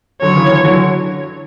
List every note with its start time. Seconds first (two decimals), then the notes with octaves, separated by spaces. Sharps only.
0.22 D3 F#3 C#5
0.36 C#3 E3
0.51 D3
0.59 E3
0.65 D3 F#3